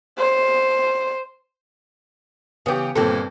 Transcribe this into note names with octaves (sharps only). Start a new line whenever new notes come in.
C5
C#3 E3 B3 G4
G1 A#2 C4 A4